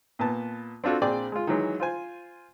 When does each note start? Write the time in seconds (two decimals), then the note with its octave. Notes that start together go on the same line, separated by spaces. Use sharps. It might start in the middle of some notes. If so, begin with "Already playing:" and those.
0.19 A#2 B3 A5
0.84 C4 D4 F4 F#4 A4
1.01 A#1 C4 G#4 D5 G5
1.32 G#3 F4
1.47 D#3 E3 F#3 G#3
1.80 F4 C5 G#5